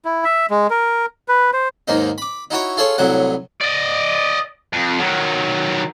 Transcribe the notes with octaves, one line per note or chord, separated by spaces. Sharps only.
E4
E5
G#3
A#4
B4
C5
D#2 G#2 A#3 D#4
B5 D6
D#4 E4 F#4 C#5
F4 G#4 A4 C#5
C2 A2 F#3 F#5
D5 D#5
F2
D#3 F#3